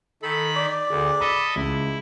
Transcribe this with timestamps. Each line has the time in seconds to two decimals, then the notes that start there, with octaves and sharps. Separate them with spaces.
0.23 D#3 A4 B5
0.56 D5
0.90 D2 G#4 A4
1.20 A4 D#5 E5 B5
1.56 C#2 E4